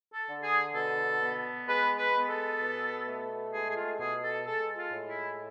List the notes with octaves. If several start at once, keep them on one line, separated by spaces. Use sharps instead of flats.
A4
D3
G#4
B2 A4
B3
G#3 B4
B4
B3
A4
B2
A3
G#3 G#4
G#4
F4
B2 G#4
A4
G#3 A4
F4
A2
E4